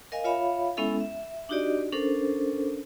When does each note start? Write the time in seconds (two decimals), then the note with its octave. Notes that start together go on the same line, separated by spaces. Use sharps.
0.12 A#4 D#5 F5 G#5
0.24 F4 C#5 E5 F5 B5
0.77 G#3 B3 C#4 E4 A4 E5
1.00 E5
1.49 D4 D#4 F#4 G4 D5 D#5
1.92 C#4 D4 A4 A#4 C5